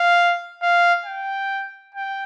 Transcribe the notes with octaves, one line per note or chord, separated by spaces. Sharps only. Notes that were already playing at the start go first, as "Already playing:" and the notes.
Already playing: F5
F5
G5
G5